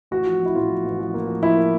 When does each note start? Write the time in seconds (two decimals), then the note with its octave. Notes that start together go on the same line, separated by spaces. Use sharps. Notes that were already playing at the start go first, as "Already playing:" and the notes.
0.11 A1 F#4
0.27 F3
0.41 A1 E4
0.55 A2 F4
0.70 F3
0.85 A1
0.99 F3
1.14 A#3
1.27 F3
1.43 F3 E4
1.57 A#3